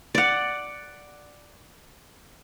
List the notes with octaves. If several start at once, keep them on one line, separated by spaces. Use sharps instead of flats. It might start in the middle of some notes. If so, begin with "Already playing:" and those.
D5 F#5